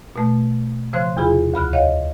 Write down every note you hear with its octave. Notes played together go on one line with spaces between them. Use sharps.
B2 A3
C#3 F3 C5 C6 F#6
E2 C3 F4 G#4 B5
D2 B5 F6 F#6
C#5 D#5 F5 F#5